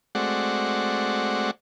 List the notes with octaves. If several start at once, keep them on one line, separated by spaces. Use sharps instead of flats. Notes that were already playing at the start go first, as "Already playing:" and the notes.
G#3 A3 C4 F#4 D5 F#5